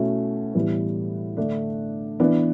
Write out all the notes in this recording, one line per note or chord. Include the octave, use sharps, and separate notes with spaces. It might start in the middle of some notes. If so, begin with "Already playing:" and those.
Already playing: B2 A3 C#4 E4
A2 E3 G3 B3
D3 A3 D4
E3 B3 D4